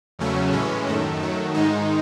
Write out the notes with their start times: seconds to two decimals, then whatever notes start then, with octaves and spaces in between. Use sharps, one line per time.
0.19 E2 C#3 F#3 A3 C#4
0.52 A2 E3 G#3 C#4
0.86 F#2 D#3 A3
1.20 D#3 F#3 A3
1.54 G#2 D#3 G#3 D#4